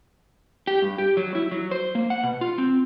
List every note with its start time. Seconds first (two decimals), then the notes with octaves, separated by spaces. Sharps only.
0.67 G4
0.82 G2
0.98 G4
1.17 F#3
1.35 E4
1.51 F#3
1.71 C5
1.95 A#3
2.10 F#5
2.23 B2
2.41 F4
2.58 C4